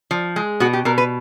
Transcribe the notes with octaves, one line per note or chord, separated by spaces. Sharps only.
F3
G#3
B2 F#4
G4
B2 A#4
B4